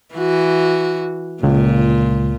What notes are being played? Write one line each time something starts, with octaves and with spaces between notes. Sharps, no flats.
E3 F#4
C#2 A#2